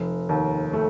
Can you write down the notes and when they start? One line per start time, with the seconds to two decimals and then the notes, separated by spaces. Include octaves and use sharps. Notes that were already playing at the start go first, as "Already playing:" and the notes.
Already playing: F1
0.29 D#2
0.73 A3